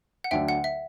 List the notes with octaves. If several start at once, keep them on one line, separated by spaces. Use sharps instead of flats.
F#5
D2 D3 F#3 A3 D4 E5 G5
F#5
E5